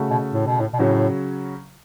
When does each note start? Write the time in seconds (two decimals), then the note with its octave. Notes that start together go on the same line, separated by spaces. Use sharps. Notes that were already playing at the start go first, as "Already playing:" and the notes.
Already playing: C#3 A3 F#4
0.10 B2
0.32 A2
0.46 B2
0.60 A2
0.73 B2
0.79 A2 C#3 F#3 C#4